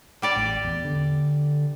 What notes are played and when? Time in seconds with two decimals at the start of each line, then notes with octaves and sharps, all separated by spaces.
0.22 G3 G4 D5
0.36 A1
0.64 E2
0.85 D3